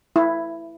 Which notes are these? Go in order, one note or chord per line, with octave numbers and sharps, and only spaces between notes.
E4